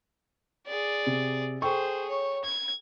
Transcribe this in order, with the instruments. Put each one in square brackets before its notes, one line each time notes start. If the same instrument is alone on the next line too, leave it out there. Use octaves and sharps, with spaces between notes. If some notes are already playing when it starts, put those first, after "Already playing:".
[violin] G#4 D5
[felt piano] C3
[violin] G#4 C5 [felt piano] A4 G5 C#6
[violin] C#5
G#6